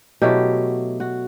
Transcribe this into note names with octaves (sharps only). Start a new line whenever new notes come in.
B2 F#3 A3 E4 G4
F#4